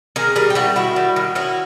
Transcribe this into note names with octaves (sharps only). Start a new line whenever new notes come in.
D#3 G#4 A#4
G3 G#4 A#4
G4
G3 E4 F#4
D#3 E4 F#4
G3
D#3
C#4 E4 F#4